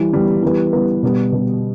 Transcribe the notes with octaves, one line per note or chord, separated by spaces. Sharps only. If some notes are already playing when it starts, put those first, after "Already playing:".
Already playing: E3 G3
E3 G3 B3
E3 G3 B3 G4 B4
E3 G3 B3 G4 B4
B2 G3 B3
B2 G3 B3